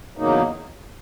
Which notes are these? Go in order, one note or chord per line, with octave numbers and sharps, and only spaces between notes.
E2 C#3 F#3 A#3 D#4